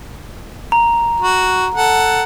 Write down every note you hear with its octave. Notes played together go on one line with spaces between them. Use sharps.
A#5
F#4
A4 F#5